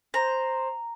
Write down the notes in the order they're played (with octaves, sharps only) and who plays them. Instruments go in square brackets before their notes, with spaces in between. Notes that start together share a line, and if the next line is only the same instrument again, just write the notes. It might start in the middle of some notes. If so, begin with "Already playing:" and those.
[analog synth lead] C5 [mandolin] A#5